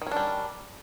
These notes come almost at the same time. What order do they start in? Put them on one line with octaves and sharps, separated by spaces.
D#3 C#4 D4 G3